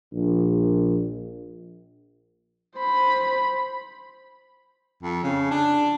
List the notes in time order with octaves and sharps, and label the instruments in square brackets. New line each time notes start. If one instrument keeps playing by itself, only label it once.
[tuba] A#1
[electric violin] C5 B5
[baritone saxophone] F2
C#3
D4